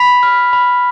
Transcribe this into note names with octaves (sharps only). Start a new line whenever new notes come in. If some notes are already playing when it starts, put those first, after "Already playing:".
Already playing: B5 B6
F6
B5